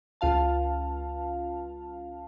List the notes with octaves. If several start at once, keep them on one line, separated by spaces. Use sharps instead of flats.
C#2 F4 F5 A5